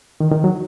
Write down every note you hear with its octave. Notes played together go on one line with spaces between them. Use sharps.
D#3
D#3
F#3